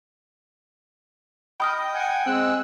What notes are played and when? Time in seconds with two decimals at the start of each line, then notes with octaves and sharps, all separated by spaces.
1.60 D#5 G5 B5 D#6 F6
1.94 F#5 G#5
2.26 G#3 C4 E6 F#6